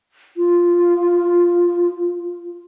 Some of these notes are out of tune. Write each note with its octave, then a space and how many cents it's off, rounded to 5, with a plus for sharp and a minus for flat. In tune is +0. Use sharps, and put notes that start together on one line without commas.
F4 +0